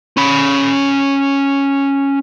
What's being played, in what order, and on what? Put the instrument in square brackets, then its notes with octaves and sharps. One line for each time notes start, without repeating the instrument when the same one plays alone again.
[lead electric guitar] C#4 B5